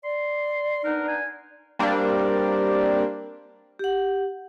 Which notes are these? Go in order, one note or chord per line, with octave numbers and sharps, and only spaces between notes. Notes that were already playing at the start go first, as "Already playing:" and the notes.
D5 C6
B3 D4 D#4 A#4
G#5
G3 A#3 C4 D4
G4 F#5